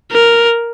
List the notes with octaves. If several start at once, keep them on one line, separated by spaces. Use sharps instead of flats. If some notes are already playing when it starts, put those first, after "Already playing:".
A#4